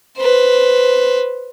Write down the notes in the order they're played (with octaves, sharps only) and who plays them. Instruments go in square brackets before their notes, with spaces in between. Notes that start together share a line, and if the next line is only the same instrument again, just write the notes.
[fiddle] B4 C5